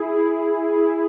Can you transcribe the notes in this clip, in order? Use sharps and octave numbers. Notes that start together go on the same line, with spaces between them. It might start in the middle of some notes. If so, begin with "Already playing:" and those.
Already playing: E4 G#4